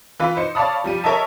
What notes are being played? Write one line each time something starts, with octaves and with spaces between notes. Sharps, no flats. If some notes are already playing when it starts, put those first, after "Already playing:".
E3 F4 B4
D#4 C5 C#7
C#5 D5 F5 A5 B5 D#6
F3 G3 D#7
A#4 C#5 D#5 E5 A5